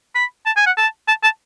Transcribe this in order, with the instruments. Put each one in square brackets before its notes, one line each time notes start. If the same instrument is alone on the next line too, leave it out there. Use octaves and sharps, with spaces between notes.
[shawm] B5
A5
G#5
F#5
A5
A5
A5